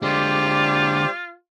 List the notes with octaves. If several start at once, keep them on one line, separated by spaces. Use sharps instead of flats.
D3 G#3 F4 G4 C5 D5